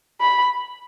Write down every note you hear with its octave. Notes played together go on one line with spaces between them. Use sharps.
B5